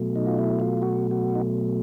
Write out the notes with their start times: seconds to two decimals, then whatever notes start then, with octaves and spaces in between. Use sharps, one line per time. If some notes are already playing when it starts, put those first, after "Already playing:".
Already playing: B2 F#3 A3
0.16 D#4
0.27 F4
0.38 E4
0.60 F4
0.82 F#4
1.11 F#4
1.35 D#4